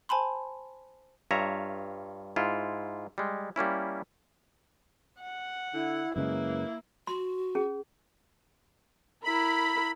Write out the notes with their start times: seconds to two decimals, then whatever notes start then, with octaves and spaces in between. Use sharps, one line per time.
0.09 C5 G#5 A5 B5 C6
1.31 G2 F4 C#5 E5 A#5
2.36 G#2 E4 F4
3.18 G3 G#3
3.56 G3 A#3 C#4 E4
5.21 F#5
5.74 D3 E4
6.16 F#2 C#3 G#3 A#3 E4 B4
7.07 F#4 C6
7.55 C#4 G#4
9.24 E4 A#4 B5